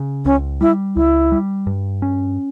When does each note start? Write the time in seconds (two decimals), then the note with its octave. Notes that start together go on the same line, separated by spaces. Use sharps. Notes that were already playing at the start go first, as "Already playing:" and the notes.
Already playing: C#3
0.25 C#2 C#4
0.61 G3 E4
0.96 C#2 E4
1.32 G3
1.67 G2
2.02 C#4